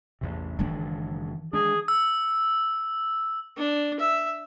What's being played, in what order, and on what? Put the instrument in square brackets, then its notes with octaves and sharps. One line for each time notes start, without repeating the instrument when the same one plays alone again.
[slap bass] A1 E2 C3
[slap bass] F#1 G#3 D4 [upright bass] D#3 E3
[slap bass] G#3 D4 [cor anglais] G#4
[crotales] E6
[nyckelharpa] D4
E5